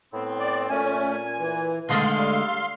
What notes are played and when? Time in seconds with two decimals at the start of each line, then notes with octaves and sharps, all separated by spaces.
0.13 A2 B3 C4
0.40 D5
0.70 A#2 A3 C#4 G#5
1.39 E3
1.89 D3 D#3 G#3 A3 F5 C6
2.18 G3 A4